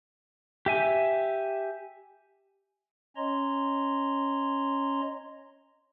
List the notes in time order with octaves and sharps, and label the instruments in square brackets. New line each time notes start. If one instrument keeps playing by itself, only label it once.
[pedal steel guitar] G4 E5 G#5
[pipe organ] C#4 C#5 D#5 A#5 C6